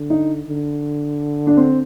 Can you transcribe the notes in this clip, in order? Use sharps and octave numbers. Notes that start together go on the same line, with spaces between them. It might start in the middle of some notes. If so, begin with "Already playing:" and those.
Already playing: D3
D#4
D3
D4
C4